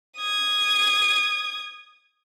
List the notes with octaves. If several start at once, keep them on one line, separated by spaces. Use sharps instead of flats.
D#6 G#6